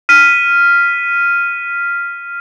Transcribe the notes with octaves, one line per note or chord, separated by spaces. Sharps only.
F6 B6 D#7